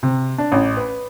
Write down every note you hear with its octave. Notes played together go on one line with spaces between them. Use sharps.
C3
D4
A1
B4